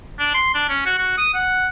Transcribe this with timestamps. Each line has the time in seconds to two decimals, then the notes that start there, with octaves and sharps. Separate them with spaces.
0.19 D4
0.34 C6
0.54 D4
0.69 C#4
0.86 F#4
0.98 F#4
1.17 D#6
1.34 F#5